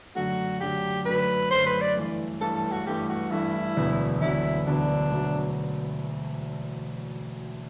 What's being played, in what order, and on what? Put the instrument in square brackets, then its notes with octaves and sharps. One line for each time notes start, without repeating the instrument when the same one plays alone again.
[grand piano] F#2 D3 F#3 A3 [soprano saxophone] F#4
[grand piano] F#2 D3 F#3 A3 [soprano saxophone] G4
[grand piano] F#2 D3 F#3 A3 [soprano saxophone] B4
[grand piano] F#2 D3 F#3 A3 [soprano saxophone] C5
[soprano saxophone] B4
D5
[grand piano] G2 E3 A3
[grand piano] G2 E3 A3 [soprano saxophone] A4
[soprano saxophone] A4
F#4
[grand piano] G2 E3 A3 [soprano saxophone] G4
[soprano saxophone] F#4
[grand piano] G2 E3 A3 [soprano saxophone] E4
[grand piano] E1 D2 D3 F#3 B3
[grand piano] E1 D2 D3 F#3 B3 [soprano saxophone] E4
[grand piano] E1 D2 D3 F#3 B3 [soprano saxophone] D4
[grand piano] E1 D2 D3 F#3 B3